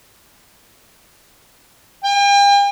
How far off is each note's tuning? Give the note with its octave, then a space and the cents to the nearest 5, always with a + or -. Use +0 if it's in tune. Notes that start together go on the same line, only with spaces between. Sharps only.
G5 +45